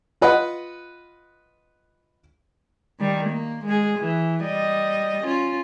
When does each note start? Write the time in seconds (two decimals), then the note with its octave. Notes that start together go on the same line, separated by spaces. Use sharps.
0.21 F4 B4 D#5 F#5
2.99 D#3 G3
3.30 A#3
3.65 G#3 G#4
3.99 E3
4.44 G3 D#5
5.24 C#4 F4